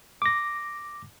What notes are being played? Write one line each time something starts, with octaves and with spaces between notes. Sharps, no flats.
D6 A#6